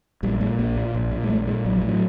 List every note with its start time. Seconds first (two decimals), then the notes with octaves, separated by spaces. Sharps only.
0.23 A#1 G3
0.41 A#2 G#3
0.59 A#1 A#3
0.76 A#2
0.94 A#1
1.11 A#2
1.23 G#3
1.29 A#1 A3
1.47 A#2 G#3
1.65 A#1 F#3
1.76 F3
1.82 A2
1.89 F#3